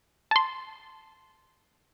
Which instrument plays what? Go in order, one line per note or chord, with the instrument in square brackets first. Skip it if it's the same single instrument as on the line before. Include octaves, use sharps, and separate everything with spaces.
[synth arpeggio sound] A5 C6